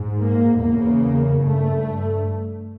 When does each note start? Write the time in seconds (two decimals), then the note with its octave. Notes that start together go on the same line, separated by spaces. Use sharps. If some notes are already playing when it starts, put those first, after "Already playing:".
Already playing: G#2
0.21 A#3
0.61 E2 C#3 A#3
1.42 G2 A3